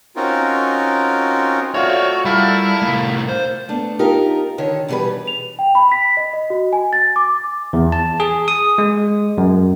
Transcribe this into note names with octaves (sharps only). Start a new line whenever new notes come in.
C4 C#4 D#4 F4 F#4 A#4
A3 F4 F#4 C#5 D5
G3 E4 F4 A4 A#4
C2 A2
C5
A3 B3 D4
D#4 F4 G4 A#4
D3 D#3 C#5
B2 E3 G3 G#4 B4
F7
G5
B5
B6
D#5
D#5
F#4
G#5
A6
D6
E2
A5
G#4
D#6
G#3
F#2